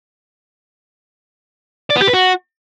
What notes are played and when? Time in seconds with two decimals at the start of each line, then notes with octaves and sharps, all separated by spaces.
1.90 D5
1.96 B3
2.02 G4
2.08 B4
2.14 F#4